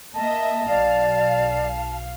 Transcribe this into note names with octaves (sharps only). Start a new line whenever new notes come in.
A#3 D#5 E5 A5
B1 D5 F5